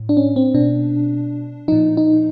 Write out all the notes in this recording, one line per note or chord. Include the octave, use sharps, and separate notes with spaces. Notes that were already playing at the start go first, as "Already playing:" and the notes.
Already playing: A2
D4
C#4
C4
B2 D4
A#2 F3 D#4
D#4